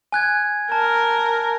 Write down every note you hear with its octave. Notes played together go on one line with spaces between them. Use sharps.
G#5 F#6 G#6
A#4 A5